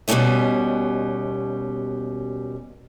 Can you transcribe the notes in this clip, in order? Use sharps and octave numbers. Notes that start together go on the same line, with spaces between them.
D#2 B2 G3 A3 C#4 D#5